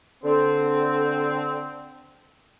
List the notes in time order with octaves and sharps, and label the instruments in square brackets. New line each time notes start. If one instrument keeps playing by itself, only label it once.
[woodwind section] D3 C4